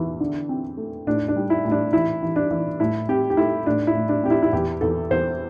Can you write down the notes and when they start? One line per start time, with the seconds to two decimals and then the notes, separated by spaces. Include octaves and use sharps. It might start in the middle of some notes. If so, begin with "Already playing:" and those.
Already playing: E2 E3
0.20 D3
0.49 C4
0.77 A3
1.07 A2 D4
1.28 D4
1.36 G3
1.50 E4
1.65 A2
1.71 D4
1.93 E3 E4
2.23 E3
2.36 D4
2.51 E3
2.80 A2 E4
3.09 C4 G4
3.30 G4
3.37 A3 E4
3.66 A2 D4
3.87 E4
3.95 A2
4.09 D4
4.24 C4 G4
4.30 E4
4.42 E4
4.53 E2 G4
4.81 E2 A4
5.10 E2 C5